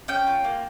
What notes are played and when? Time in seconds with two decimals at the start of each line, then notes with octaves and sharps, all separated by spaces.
0.08 C#4 G5
0.27 F4
0.44 A#3